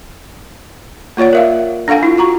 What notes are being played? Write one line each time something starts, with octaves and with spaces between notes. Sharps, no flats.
A#3 F4 C#5 D5 F#5
A#4 E5 F5
D4 A4 F5 F#5 G#5
E4 F4
F4 F#4 A#5 C#6